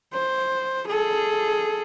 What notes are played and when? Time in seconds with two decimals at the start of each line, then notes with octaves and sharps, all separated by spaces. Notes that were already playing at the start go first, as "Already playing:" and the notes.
0.13 C5
0.87 G#4 A4